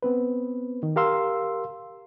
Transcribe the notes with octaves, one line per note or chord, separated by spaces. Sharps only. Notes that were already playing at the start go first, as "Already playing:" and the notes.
B3 C4 B4
D#3
G4 A#4 F5 C6 E6